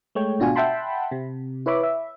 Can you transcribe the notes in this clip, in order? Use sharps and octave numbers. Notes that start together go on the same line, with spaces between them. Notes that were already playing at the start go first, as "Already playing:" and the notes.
G#3 A3 C#5 G5
G#1 B2 D4 F4 F#4 G#5
E5 F#5 G5 A5 B5 C6
C3
E4 B4 C#5 E5 B5 D6
E5